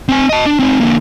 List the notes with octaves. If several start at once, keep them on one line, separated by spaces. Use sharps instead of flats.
C4 G#5
D#5 A5
D4
C4 D#4
D3 A#3